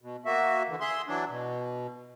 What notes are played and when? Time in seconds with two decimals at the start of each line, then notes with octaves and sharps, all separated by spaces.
0.02 B2
0.25 A#3 F#4 E5
0.68 D3 E3
0.80 G#4 E5 C6
1.08 E3 F#3 D4
1.30 B2